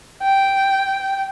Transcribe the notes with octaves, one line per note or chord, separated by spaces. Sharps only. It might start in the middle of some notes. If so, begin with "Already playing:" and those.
G5